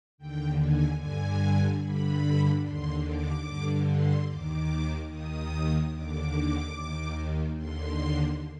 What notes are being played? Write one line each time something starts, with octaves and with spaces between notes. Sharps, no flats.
D#2 D3 G5
G#5
G2 D3 G#5
G2 D3 B5
D#2 D3 C6
D6
G2 D3
C6
D#2 D#3 D6
D#2 D#3 D#6
D#2 D3 D6
D#2 D#3
D#2 D3 C6